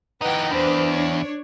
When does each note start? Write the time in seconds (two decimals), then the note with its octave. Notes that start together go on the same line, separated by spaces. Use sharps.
0.22 E3 D#4 B4 F#5 G5
0.51 E2 D4 B4 C5
0.90 C#5